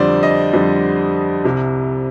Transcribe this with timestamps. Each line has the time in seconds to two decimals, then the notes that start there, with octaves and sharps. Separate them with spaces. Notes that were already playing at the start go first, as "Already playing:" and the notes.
Already playing: F2 D3 G3 C5 D5
0.23 D#5
0.54 F2 D3 G3
1.44 C2 C3 G3